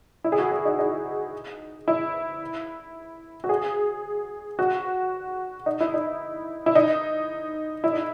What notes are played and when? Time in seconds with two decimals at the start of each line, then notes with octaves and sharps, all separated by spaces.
0.24 E4
0.32 G#4
0.38 F#4
0.51 G#4
0.65 D#4
0.79 D#4
1.88 E4
3.44 F#4
3.49 G#4
4.59 F#4
5.66 D#4
5.80 E4
5.94 D#4
6.66 E4
6.75 D#4
7.84 E4
7.93 D#4